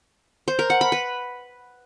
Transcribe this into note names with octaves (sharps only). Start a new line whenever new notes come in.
C5
A#4
F#5
B5
B4